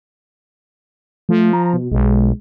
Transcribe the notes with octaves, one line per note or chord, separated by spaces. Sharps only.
F3 A3
A#5
B2
B1 G#3